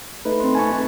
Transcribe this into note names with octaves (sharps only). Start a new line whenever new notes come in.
A3 D#4 B4
C4 C6
G#5 A5 C#6